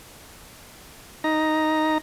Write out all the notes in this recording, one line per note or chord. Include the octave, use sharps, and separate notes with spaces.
D#4 A#5